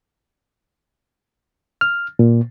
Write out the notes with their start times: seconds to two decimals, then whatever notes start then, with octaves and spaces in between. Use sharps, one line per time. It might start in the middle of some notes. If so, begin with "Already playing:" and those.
1.81 F6
2.19 A#2